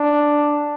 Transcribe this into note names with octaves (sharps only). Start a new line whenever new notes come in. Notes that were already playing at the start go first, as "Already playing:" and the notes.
Already playing: D4